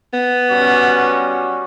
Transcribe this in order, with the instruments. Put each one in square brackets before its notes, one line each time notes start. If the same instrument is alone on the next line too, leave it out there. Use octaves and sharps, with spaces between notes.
[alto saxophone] B3
[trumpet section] G3 C#4 F#4